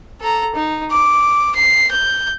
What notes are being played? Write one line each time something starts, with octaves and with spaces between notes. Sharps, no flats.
A4 A#5
D#4
D6
C7
G6